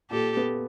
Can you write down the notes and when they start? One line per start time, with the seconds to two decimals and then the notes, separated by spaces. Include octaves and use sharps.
0.10 A#2 G4 A4
0.37 B3